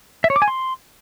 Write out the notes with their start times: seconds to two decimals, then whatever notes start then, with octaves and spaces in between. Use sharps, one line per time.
0.24 E5
0.30 C#5
0.36 D6
0.42 G#5
0.48 C6